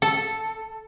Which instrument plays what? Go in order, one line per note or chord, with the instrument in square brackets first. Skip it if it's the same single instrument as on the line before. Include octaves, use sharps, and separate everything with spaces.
[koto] A4